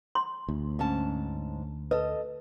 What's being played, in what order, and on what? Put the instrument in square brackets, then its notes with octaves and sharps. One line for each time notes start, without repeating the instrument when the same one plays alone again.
[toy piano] C6
[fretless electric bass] D2
[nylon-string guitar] G#2 C#4 A5
[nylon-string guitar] A4 D#5 [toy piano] B4